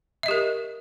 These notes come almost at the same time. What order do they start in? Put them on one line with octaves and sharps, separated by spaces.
E5 D#5 G4 A#4